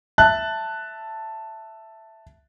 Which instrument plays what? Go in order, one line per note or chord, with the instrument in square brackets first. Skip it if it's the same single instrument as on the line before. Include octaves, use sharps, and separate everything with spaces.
[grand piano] E5 A5 F#6